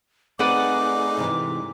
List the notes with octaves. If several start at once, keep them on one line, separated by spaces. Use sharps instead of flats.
A3 C4 D#4 G#4 B4 D5 F#5 D6
G#2 C3 E3